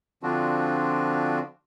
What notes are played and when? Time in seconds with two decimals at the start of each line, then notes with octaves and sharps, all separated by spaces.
0.23 D3 F3 C4 D4 F4 F#4